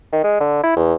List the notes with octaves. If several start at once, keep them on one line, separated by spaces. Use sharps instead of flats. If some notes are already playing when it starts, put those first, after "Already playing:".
D#3
G#3
D3
E4
E2